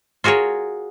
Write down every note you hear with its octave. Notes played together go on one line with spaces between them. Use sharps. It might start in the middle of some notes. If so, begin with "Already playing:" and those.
F4 F#4 G#4 A#4 C#5